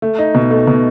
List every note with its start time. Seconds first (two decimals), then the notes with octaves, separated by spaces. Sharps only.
0.02 A3
0.18 D#4
0.35 B2
0.51 A3
0.67 B2